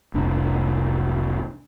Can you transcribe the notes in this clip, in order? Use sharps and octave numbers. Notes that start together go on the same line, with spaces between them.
F1 C2 D4